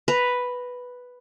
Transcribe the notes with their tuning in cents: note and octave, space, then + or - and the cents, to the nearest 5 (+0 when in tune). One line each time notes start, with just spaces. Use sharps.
B4 +0 A#5 +0